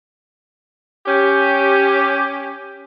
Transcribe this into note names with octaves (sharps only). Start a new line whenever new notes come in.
C#4 G4